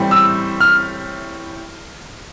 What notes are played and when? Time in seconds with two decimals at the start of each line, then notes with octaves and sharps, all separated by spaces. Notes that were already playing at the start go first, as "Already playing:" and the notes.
Already playing: A2 E3 G3 C4
0.11 E6
0.60 F6